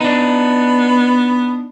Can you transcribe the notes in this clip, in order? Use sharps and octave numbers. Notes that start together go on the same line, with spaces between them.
B3 D4 D#4